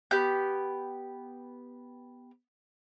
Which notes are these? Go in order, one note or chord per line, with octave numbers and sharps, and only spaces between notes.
B3 G4 G6